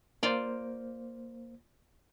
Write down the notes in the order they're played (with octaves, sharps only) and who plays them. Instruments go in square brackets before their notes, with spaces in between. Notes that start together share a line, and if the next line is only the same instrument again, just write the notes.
[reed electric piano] A#3 C5 [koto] F4 D5